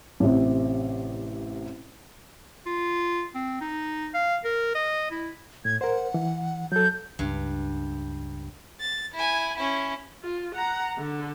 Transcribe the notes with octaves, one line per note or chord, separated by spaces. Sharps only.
A1 C3
F4
C4
D#4
F5
A#4
D#5
E4
A2 G#6
A#4 C5 F#5
E3
F#3 A4 G6
C#2 G2 D4
A6
E4 G#5
C#4 E4
F4
F#5 A#5
D3